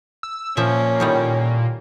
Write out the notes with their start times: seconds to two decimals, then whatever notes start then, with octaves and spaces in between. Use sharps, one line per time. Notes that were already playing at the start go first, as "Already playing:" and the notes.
0.23 E6
0.57 A#2 F3 C#4 E5
1.00 A2 D#3 G3